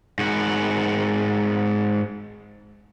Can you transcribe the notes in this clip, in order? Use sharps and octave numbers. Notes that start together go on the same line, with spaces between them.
G#2 F#4